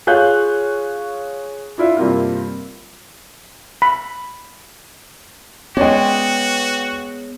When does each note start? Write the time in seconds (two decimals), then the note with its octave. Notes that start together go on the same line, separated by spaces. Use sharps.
0.07 F4 G#4 C#5 F5 F#6 G6
1.78 D4 E4 F4
1.97 G2 C3 A#3 C4 F4
3.82 B5
5.77 G#3 B3 C#4 F#4 D5 G5